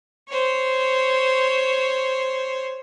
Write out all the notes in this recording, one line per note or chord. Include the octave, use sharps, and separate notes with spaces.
C5 C#5